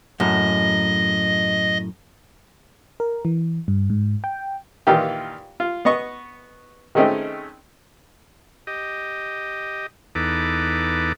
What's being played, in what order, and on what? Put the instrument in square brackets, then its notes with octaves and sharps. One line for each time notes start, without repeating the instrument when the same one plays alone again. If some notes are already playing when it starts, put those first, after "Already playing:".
[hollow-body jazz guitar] F#2 A2 [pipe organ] D#5
[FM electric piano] A#4
E3
G2
G#2
G5
[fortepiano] A#2 D#3 E3 F4 G4
F4
B3 D#5 C#6
D#3 G#3 A3 C4 C#4 D#4
[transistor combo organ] G4 D#5
E2 D#4 A4 B4 D6